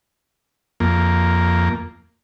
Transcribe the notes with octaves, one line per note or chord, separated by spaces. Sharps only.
F2 A#3